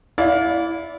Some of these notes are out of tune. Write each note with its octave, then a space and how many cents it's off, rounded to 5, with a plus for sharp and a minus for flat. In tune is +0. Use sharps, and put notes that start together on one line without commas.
E4 +0 D5 -25 F5 +25